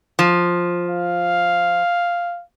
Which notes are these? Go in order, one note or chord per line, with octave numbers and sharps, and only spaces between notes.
F3
F5